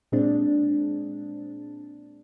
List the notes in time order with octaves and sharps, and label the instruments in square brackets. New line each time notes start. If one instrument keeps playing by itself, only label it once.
[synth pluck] A#2 G#3 C4 D4